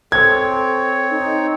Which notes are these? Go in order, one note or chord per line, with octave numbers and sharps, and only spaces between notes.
C4 A4 C#5 G#6
D#4